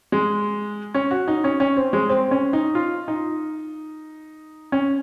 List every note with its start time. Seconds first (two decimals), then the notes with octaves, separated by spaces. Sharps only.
0.12 G#3
0.94 C#4
1.11 F#4
1.28 D#4
1.44 C#4
1.60 C#4
1.77 C4
1.93 G#3
2.09 C4
2.31 C#4
2.53 D#4
2.75 F4
3.08 D#4
4.72 C#4